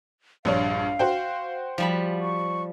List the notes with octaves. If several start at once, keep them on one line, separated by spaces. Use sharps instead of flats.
A#1 G2 C#5 F5
F#4 C5 G5
F3 G3 B5
C#6